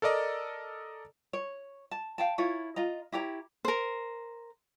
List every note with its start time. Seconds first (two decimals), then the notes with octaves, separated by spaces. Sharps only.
0.02 A4 A#4 D5 D#5 A#5
1.33 C#5
1.91 A5
2.18 F5 G5 A5
2.38 E4 F4 C#5
2.76 F4 D#5 A#5
3.12 E4 G4 C#5 A#5
3.65 A#4 C5